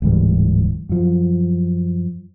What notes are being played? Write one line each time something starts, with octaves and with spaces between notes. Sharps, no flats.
D1 G#2 E3 G3
F#2 F3